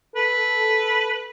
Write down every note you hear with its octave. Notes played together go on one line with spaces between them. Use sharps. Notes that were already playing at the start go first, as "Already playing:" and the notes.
A4 B4